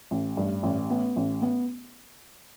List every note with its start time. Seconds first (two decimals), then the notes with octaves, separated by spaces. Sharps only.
0.11 A1
0.37 G2
0.63 A1
0.90 B3
1.16 A1
1.42 B3